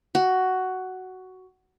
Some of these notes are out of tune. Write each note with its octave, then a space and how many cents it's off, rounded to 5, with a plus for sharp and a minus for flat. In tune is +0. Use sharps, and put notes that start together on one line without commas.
F#4 +10